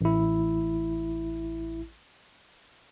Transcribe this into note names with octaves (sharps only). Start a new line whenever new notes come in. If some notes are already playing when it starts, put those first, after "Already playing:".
A1 E4